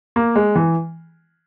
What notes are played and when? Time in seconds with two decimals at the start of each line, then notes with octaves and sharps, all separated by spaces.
0.16 A#3
0.36 G#3
0.55 E3